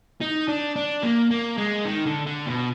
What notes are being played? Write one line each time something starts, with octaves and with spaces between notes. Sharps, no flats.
D#4
D4
D4
A#3
A#3
G#3
D#3
D3
D3
B2